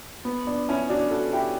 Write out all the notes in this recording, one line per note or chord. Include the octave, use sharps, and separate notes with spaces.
B3
B3 D4
C#4 E4
D4 F#4
F#4 A4
E4 G4